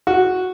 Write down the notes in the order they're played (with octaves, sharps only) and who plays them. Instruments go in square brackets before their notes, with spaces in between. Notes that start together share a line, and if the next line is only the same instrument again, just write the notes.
[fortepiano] F#4